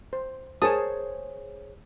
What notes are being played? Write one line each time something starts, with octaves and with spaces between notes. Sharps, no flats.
C5
G#4 A#4 C5 C#5 A5 D#6